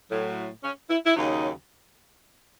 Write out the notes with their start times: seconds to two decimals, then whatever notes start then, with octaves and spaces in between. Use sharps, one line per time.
0.10 A2 F#3
0.62 C#4
0.89 E4
1.06 E4
1.14 D#2 C#3 F#3 D#4